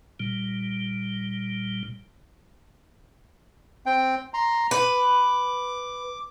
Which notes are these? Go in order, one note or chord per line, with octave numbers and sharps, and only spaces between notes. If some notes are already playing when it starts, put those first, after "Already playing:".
A#2 G3
C4 G5
A#5 C6
B4 D6